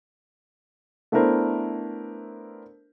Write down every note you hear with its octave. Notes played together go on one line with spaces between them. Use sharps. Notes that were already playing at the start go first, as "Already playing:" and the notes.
A3 B3 D4 E4 A#4 C5